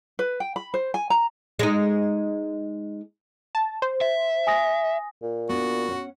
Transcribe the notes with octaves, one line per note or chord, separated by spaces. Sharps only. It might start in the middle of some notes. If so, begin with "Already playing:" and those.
B4
G5
B5
C5
G#5
A#5
G#3 D#4
A5
C5
E5
G#5 D#6 A#6
A#2
B3 D4 F#4
C#4 F#5